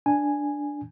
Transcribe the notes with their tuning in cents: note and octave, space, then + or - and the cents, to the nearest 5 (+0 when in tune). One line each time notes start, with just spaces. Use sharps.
D4 +0 G#5 +0